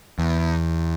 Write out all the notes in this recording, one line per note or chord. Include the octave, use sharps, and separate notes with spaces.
E2